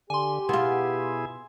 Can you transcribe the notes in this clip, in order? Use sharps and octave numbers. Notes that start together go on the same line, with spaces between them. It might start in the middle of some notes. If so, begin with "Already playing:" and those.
D3 G4 G#5 C6
B2 B3 E4 F4 G#4